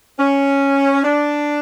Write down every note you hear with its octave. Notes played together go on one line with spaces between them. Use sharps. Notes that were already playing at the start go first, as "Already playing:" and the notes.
C#4
D4